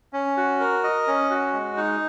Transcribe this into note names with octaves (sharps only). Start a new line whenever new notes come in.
C#4
F#4
A#4
D#5
C#4
F#4
G#3
D#4